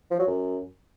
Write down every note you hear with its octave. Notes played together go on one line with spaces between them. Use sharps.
F3
F#3
F#2